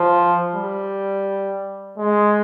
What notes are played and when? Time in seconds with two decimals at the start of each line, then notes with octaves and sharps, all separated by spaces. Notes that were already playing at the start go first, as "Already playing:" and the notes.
Already playing: F3
0.55 G3
1.98 G#3